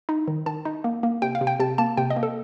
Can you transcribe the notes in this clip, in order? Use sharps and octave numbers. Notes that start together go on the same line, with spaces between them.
D#4
D#3
D#3 A5
D#4
A#3
A#3
C3 G5
F5
C3
G5
C3 A5
A#3 A5
C3 G5
D#5
A#3
A4